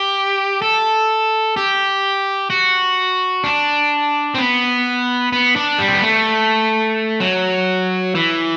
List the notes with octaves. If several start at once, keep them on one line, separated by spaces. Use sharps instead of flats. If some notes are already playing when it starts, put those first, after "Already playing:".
Already playing: G4
A4
G4
F#4
D4
C4
B3
B3
D4
G3
C4
B3
A3
F#3
E3